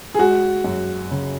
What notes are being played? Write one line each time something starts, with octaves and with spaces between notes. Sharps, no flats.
G#4
G#3 F#4
F#2
C#3